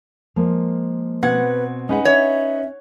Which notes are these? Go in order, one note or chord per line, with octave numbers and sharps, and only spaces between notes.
F3 G#3 A#3
B2 C4 B4 F#5 G#6
G#3 C#4 D#4 B4 F#5
C#5 E5